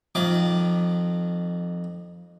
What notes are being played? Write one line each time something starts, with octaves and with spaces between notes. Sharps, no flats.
F2 D#3 D6